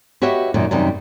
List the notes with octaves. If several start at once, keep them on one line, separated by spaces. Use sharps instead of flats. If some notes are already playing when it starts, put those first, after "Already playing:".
F#4 G4 B4 C#5 D#5 E5
F#2 A#2 D#3
F#2 C3 D#3 G3